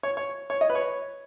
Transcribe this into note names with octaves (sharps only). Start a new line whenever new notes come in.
C#5
C#5
C#5
D#5
B4
C#5